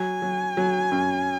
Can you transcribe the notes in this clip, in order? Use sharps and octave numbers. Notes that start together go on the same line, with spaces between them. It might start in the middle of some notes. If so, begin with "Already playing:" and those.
Already playing: F#3 G#5
F#3
F#3
F#2